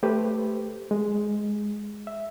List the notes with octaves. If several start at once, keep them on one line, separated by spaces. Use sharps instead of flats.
A3 G4 B4 C5
G#3
E5